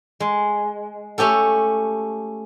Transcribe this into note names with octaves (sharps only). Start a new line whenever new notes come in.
G#3
A3 C#4 G4 A4